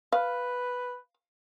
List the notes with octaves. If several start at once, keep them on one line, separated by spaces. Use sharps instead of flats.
B4 F5